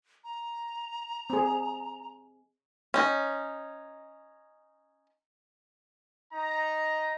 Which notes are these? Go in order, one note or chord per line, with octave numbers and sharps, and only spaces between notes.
A#5
C4 G#4
C#4 D#4
D#4 A#5